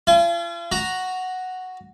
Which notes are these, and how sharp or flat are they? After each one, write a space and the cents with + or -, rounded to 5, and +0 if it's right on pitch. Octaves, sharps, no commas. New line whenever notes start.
F4 -40 G#5 +40
F#4 +0 A#5 +0